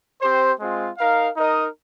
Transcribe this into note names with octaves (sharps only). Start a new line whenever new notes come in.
C4 G4 C5
G#3 C4 F4
D#4 A#4 F5
D#4 A#4 D#5